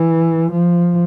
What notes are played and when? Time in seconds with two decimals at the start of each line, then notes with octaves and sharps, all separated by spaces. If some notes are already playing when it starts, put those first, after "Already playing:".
Already playing: E3
0.51 F3